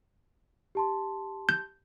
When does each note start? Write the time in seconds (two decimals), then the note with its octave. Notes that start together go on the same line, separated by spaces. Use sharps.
0.75 G4 A5 C6
1.49 G6